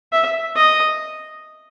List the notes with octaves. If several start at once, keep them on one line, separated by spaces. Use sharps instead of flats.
E5
D#5